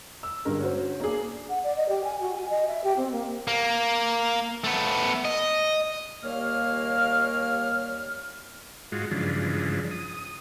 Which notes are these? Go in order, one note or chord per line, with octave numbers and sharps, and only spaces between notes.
E6
G2 D3 G#3 A#4
C#4 F#4 C5
A#3 D4 G#4
F#5
D5
D#5
G4
G#5
F#4
G#5
D#5
E5
G4
C4
A#3
A#3
A3 B3
D#5
D#2 G3 A#3 C#5 F5 F6
G#2 G#3 F4 F#4
G2 C#3 E3 F3 G#3 D4
D#6